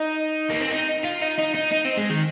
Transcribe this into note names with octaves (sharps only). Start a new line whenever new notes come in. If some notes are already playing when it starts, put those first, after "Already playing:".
Already playing: D#4
A#3
C4
D#4
F4
D#4
D#4
D#4
D#4
C4
G#3
D#3